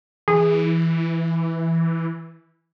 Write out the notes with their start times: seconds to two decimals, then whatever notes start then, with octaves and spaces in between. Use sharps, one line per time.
0.28 E3 G#4